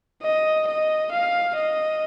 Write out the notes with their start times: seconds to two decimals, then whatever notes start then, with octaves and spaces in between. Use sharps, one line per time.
0.22 D#5
0.67 D#5
1.11 F5
1.56 D#5